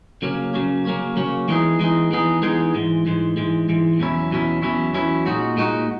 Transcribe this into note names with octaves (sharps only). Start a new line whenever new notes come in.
C#3 F#3 A#3 C#4
C#3 F#3 A#3 C#4
C#3 F#3 A#3 C#4
C#3 F#3 A#3 C#4
E3 G#3 B3 D#4 G#4
E3 G#3 B3 D#4 G#4
E3 G#3 B3 D#4 G#4
E3 G#3 B3 D#4 G#4
G#2 E3 G#3
G#2 E3 G#3
G#2 E3 G#3
G#2 E3 G#3
E2 B2 F#3 C#4 E4
E2 B2 F#3 C#4 E4
E2 B2 F#3 C#4 E4
E2 B2 F#3 C#4 E4
A#2 G#3 D#4 F#4
A#2 G#3 D#4 F#4